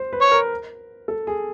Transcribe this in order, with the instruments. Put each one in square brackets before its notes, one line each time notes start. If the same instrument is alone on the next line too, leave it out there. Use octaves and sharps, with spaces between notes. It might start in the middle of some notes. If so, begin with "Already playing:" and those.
Already playing: [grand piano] C5
B4
[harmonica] C#5
[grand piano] A#4
A4
G#4